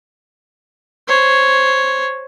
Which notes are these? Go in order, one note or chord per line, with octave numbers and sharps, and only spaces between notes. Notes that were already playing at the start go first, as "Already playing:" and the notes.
C5 C#5